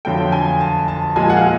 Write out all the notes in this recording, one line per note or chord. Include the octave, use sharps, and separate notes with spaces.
F2 D3 F#3 A3 G5
G#5
A5
A5
A#2 F3 G#3 G#5
F#5
F5